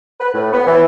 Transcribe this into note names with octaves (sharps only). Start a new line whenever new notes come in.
B4
A2
B3
E3